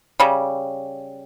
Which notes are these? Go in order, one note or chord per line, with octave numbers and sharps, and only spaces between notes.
C#3 G3